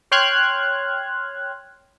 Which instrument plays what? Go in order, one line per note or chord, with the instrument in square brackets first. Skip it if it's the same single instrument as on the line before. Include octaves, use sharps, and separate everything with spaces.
[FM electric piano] C#5 G5 C6 F6 F#6 G#6